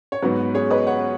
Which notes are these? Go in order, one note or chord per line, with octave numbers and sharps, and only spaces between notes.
C#5
G#2 F#3 B3 F#4 B4
G#4 C#5
B4 D#5
C#5 F#5